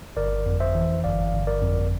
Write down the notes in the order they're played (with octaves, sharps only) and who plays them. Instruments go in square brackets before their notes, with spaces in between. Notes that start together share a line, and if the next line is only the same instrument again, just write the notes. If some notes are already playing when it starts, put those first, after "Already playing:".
[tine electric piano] G1 A#4 D5
F2
C5 E5
E3
G1 D5 F5
G1
A#4 D5
F2